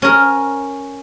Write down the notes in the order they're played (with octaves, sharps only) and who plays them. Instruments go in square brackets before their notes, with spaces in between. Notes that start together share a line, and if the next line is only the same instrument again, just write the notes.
[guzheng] C#4 A#4